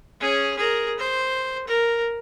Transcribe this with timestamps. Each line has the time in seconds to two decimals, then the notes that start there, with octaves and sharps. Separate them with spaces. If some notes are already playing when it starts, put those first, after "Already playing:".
0.20 C#4 G#4
0.57 G#4 A#4
0.99 C5
1.68 A#4